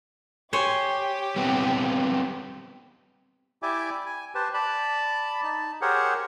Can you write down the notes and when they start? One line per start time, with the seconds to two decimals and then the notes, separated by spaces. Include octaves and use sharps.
0.53 G4 C5 C#5 G#5
1.36 G3 B3 C4
3.63 E4 G4 D5 E5 G#5 D6
4.06 G#5
4.35 G4 B4 C5 A5
4.54 D5 A5 B5
5.44 D#4 A5
5.82 G4 G#4 A#4 C5 C#5 F#5